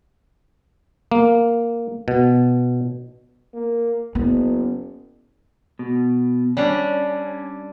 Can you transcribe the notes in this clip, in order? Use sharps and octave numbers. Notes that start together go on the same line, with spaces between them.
A#3
B2
A#3
F#1 B3
B2
G3 C#4 D4